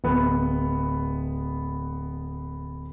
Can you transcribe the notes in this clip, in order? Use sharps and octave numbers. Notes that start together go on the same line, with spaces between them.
D1 B3